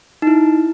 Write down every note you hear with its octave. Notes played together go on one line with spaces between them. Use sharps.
D#4
E4